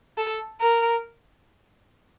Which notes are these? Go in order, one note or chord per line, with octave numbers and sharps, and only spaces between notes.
A4
A#4